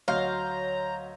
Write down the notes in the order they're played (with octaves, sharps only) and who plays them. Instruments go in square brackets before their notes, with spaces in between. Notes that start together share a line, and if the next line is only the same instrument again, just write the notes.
[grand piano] D2 F#3 D#5 [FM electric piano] C#5 C6 G6 [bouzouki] F5 [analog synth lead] A#5